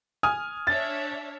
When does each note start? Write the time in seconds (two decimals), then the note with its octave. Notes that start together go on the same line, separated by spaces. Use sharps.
0.23 G#5 D#6 F6
0.67 D4 C#5 E5 A6